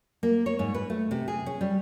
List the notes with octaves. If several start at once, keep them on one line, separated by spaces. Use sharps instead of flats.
A#3
C#5
G#2
B4
A3
C3
G#4
C#4
G3